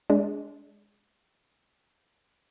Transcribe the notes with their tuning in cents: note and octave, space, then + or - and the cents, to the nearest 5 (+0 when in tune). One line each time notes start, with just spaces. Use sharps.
G#3 +0 D4 -30